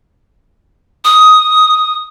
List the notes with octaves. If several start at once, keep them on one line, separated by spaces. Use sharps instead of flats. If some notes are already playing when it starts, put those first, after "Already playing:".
D#6